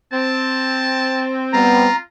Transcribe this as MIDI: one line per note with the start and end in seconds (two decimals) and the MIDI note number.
0.12 1.97 60
0.12 1.38 81
1.53 1.88 55
1.53 1.88 59
1.53 2.01 65
1.53 1.96 82